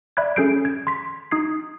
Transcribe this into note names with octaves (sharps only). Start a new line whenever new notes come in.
D5 E5 B5 F#6 G#6
C#4 G#4 A4 G6 C7 D7
G#6
C6 B6
D#4 D#6 G#6 C7